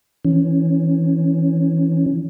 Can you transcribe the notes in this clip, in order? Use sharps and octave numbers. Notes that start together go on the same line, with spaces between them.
E3 C#4